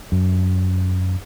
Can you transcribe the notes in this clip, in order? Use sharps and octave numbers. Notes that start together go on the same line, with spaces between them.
F#2